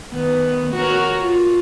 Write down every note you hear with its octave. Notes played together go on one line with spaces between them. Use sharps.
D#3 B3
F#4 A#4 C#5
F4